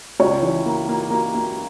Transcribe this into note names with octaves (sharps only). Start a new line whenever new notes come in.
C#2 C#5
E3
A#3
A#3
A#3
A#3